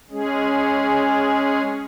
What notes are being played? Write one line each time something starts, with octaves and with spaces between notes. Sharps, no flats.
G#3 C#4 G#4